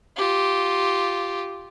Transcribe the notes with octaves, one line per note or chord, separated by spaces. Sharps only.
F4 G4